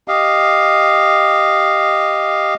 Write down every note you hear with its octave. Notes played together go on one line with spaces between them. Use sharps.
G4 D#5 F5